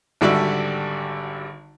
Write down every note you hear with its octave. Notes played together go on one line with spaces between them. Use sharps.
G#1 D3 G3 F#4 D5 E5